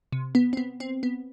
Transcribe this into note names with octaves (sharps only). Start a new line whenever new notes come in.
C3
B3
C4
B3
C4
B3